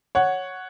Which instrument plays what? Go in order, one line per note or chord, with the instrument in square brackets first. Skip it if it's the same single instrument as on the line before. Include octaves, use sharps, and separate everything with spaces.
[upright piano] C#5 F#5